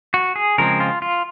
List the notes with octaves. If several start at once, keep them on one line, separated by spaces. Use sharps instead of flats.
F#4
G#4
C#3 F3 G#3 C4 A#4
F4
F4